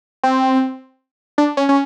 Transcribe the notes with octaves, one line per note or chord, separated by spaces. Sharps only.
C4
D4
C#4
C#4